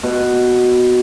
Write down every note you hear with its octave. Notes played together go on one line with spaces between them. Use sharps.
B2